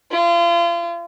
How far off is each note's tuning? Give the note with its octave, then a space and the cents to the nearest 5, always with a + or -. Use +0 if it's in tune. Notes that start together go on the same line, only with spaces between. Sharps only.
F4 -35